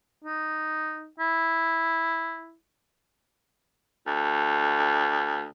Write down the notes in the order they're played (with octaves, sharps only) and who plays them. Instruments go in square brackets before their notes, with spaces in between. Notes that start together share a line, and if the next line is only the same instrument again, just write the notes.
[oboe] D#4
E4
[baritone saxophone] D2